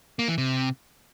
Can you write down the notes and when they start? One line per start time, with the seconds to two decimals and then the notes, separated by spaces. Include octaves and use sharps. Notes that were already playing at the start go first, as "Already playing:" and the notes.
0.19 A#3
0.28 E3
0.38 C3